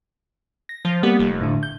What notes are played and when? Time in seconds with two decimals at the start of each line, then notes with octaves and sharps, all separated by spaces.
0.69 A#6
0.85 F3
1.03 G3 A#3 B3
1.19 F1
1.41 A2 D3
1.63 G6